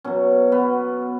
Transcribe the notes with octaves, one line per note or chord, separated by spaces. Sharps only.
B2 F#3 C#4
B3